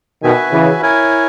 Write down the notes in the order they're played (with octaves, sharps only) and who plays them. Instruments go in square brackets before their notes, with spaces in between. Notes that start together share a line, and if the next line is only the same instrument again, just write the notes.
[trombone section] B2 D#3 [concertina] F#4 B4 E5 G#5
[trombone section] C#3 E3
[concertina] E4 A#4 C#5 G#5